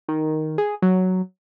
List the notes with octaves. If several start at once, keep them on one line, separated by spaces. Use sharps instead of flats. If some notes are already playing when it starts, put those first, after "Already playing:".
D#3
G#4
F#3